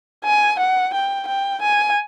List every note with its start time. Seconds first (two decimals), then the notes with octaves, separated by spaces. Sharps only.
0.25 G#5
0.59 F#5
0.94 G5
1.28 G5
1.62 G#5